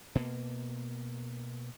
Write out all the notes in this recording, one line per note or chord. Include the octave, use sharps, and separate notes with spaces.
B2 A#3